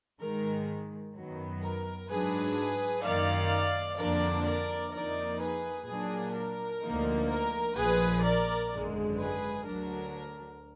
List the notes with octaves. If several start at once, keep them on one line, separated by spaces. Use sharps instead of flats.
G#2 D#3 G#3 A#4
F#2 D#3 F#3 B3
A#4
G#2 F#3 D4 G#4 B4
F#2 D#3 A#3 D#4 D5 F5
F2 D3 F3 A#3 D4 A#4 D5
A#4 D5
F2 F3 A#3 D#4 A#4 D5
G#4 B4
A#2 F#3 A#3 D4 G#4
A#4
D2 D3 F3 A#3 D#4
A#4
A#1 A#2 F3 G#4 B4
A#4 D5
G#1 F#2 D3 G#3
G#4 B4
D2 D3 F#3 D4 A#4